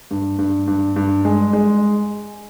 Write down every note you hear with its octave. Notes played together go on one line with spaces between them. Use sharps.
G2
G2
G2
G2
G#3
G#3